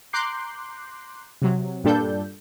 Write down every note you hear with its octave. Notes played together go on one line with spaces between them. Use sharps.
A#5 C6 D6 F#6 G6 C7
C3 F#3
G2 A#2 G3 D4 A4 G6